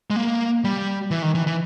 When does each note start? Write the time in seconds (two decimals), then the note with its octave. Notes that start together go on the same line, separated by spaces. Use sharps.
0.10 G#3
0.16 A#3
0.64 G3
1.11 E3
1.22 D#3
1.35 E3
1.47 E3